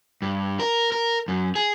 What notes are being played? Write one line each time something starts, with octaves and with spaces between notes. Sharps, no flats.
G2
A#4
A#4
F#2
G#4